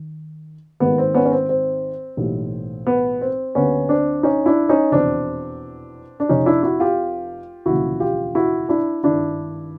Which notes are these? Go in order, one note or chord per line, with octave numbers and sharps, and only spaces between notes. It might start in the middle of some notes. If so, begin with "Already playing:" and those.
Already playing: D#3
G#1 G#2 D#3 G3 A#3 B3
C4
B3 C#4
C#4
C4
C4
B1 A2 E3 G3 A#3
B3
C4
D2 D3 G3 A#3 B3 C#4
C4 D4
C#4 D#4
D4 E4
C#4 D#4
F1 E2 B2 C4 D4
D4
F1 F2 C3 C#4 D#4
D4 E4
E4 F#4
F4 G4
E1 D2 C#3 F3 A#3 E4 F#4
F4 G4
E4 F#4
D4 E4
G#1 G2 D#3 D4 E4